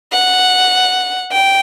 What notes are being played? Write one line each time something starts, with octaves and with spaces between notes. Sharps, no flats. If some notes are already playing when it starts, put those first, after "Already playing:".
F#5
G5